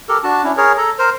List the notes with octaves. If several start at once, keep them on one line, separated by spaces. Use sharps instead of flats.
G4 A4 A#4
D4 F#4 A5
C#4 D4 E4
G#4 A#4 C#5
A4 A#5
A#4 C5